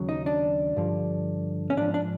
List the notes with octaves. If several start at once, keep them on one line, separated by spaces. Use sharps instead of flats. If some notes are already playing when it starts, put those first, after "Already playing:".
Already playing: D#2 C#3 F#3
D#4
D4
G2 D3 F3
C#4
G#2 F3 D4
D4